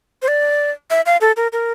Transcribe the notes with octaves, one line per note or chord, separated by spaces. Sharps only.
C5
D5
E5
F5
A4
A#4
A#4